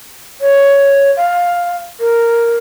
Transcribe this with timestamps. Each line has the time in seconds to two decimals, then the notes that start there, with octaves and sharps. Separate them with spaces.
0.41 C#5
1.17 F5
2.00 A#4